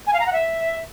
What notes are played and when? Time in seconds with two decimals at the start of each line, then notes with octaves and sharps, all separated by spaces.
0.07 G#5
0.13 F5
0.20 A#5
0.26 F#5
0.33 E5